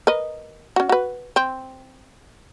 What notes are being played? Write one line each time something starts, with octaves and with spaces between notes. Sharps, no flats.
A#4 B4 D#5
C#4 F#4
F#4 B4
C4